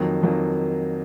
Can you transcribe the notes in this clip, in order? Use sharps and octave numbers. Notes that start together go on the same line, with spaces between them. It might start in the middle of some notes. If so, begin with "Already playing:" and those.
Already playing: F2 D#3 F#3 A#3
F2 D#3 F#3 A#3